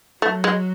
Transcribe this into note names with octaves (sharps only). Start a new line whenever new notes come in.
F#3 A3
G#3